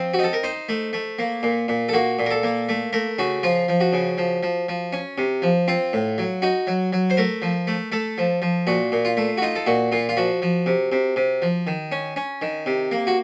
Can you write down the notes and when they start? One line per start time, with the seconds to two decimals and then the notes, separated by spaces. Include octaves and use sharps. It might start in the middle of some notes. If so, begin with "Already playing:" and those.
Already playing: F3 C4
0.14 F#4
0.19 D#4 A4
0.33 A#4
0.43 D#4 C5
0.69 A3
0.93 A3
1.19 A#3
1.43 A#2
1.68 A#2
1.89 A4
1.93 A#3 F#4
2.19 A#2
2.26 A#4
2.31 A4
2.43 A#3
2.69 A3
2.93 A3 A#4
3.18 C#3 F#4
3.43 F3 F4
3.68 F3
3.80 F#4
3.93 C#3
4.18 F3
4.43 F3
4.69 F3
4.93 C#4
5.18 C3
5.42 F3
5.68 C4 F4
5.93 A2
6.18 F#3
6.42 D#4 F#4
6.67 F#3
6.93 F#3
7.10 C5
7.17 A3 A#4
7.42 F3
7.67 A3
7.92 A3 A4
8.18 F3
8.42 F3
8.67 A#2 F#4
8.92 A#2
9.05 F4
9.17 A3
9.37 F#4
9.42 D#4 F4
9.56 A4
9.66 A#2 F#4
9.92 A#2 F4
10.09 F4
10.17 F3 F#4
10.42 F3
10.66 C3
10.92 C3
11.16 C3
11.42 F3
11.67 D#3
11.92 C#4
12.16 C#4
12.42 D#3
12.66 C3
12.92 A#3
13.07 F#4